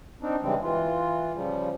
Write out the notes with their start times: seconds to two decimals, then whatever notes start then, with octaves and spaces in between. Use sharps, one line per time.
0.22 C4 D4 D#4
0.43 C#3 E3 G3 G#3 C4
0.62 E3 F4
1.35 C#3 F3 G3